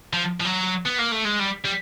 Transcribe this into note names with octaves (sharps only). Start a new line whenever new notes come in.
F3
F3
F#3
B3
A#3
A3
G#3
G3
G3